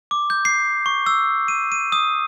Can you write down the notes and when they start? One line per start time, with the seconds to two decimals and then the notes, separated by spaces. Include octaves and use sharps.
0.11 D6
0.30 G6
0.45 C7
0.86 C#6
1.06 E6
1.48 D#7
1.72 D#7
1.92 D#6